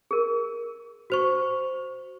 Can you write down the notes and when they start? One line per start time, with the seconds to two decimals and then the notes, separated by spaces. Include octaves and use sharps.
0.11 G#4 A#4
1.10 F#4 C5 C#6